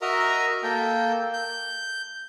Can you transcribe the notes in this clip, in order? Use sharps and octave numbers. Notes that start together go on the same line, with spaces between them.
F#4 A#4 D#5 E5 A#5
A#3 A4 G5
G6